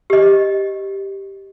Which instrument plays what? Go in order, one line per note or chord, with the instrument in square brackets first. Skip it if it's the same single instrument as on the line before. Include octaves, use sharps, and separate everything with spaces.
[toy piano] G4 D#5